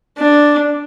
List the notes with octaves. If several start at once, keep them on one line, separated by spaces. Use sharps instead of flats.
D4